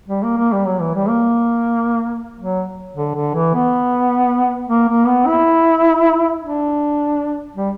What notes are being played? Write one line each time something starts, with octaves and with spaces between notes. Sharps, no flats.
G3
A#3
A#3
G3
F#3
E3
G3
A#3
F#3
D3
D3
E3
B3
A#3
A#3
B3
E4
D4
G3